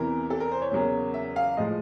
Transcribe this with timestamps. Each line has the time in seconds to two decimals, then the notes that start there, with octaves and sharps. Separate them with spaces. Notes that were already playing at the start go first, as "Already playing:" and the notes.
Already playing: E2 C3 E3 A#4
0.30 A4
0.40 A#4
0.52 C5
0.62 C#5
0.71 E2 C#3 F#3 A#3
1.14 E5
1.36 F5
1.57 A2 F3 G#3 D#5